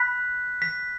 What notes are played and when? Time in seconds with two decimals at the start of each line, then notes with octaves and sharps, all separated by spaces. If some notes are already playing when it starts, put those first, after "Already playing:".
Already playing: B5 F#6 B6
0.62 B6